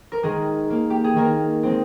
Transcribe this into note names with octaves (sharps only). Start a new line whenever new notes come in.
A#4
D#3 G#3 G#4
A#3
G4
G#4
D#3 A#3 A#4
G#3 C4